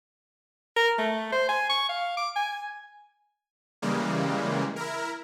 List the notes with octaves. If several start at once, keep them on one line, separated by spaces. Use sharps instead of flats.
A#4
A3
C5
G#5
C#6
F5
D6
G#5
C#3 E3 G3 G#3 A#3
E4 A#4